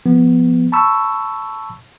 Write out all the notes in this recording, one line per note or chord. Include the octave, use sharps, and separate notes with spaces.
F3 B3
A5 B5 C#6 E6